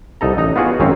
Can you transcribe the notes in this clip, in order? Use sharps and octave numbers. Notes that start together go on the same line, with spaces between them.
C2 D#4 A4 A#5
A1 D#4 A#5
B3 F4 F#4 G#4 B4
G#1 F#2 C4 C#4 F5